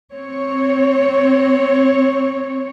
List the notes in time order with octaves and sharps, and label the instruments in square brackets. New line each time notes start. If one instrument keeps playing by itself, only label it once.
[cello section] C4 C#5